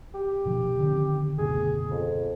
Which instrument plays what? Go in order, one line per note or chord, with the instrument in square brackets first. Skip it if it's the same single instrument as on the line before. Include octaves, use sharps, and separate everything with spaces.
[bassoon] G4
[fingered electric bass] B2 F3
D3 D#3 C4
[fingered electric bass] F#1 D2 B2 [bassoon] G#4
[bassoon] F2